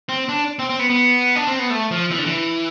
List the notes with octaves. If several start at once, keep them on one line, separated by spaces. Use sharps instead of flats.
C4
D4
C4
C4
B3
B3
D4
C4
B3
A3
F3
E3
D3
E3